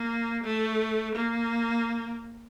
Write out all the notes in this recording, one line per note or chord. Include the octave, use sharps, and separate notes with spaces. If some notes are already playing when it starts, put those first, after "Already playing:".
Already playing: A#3
A3
A#3